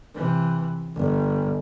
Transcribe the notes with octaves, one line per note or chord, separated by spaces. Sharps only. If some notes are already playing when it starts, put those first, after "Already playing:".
C3 E3
G1